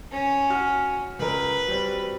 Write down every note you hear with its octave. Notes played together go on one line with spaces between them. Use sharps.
C#4
F#4 G#5 F6
C#2 A#4 B4
F#3 G3 C4